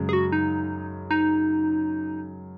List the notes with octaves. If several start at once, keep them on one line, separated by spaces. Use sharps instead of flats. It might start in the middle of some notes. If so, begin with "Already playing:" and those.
Already playing: F#2 C#3 G#3
G#4
F#4
D#4
D#4